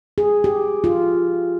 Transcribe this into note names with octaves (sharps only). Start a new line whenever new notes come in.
G#4
G4
F4